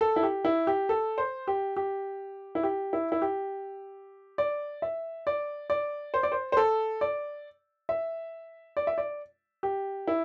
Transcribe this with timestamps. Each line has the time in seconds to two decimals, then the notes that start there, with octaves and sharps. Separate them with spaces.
0.01 A4
0.16 E4
0.23 G4
0.45 E4
0.67 G4
0.89 A4
1.18 C5
1.48 G4
1.77 G4
2.55 E4
2.63 G4
2.93 E4
3.12 E4
3.22 G4
4.38 D5
4.82 E5
5.27 D5
5.70 D5
6.14 C5
6.23 D5
6.32 C5
6.52 C5
6.57 A4
7.01 D5
7.89 E5
8.77 D5
8.87 E5
8.98 D5
9.63 G4
10.08 E4